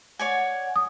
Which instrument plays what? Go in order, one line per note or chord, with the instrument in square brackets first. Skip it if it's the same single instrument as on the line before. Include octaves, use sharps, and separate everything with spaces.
[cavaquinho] C#5 D5 G#5 [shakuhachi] F#5
[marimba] D#6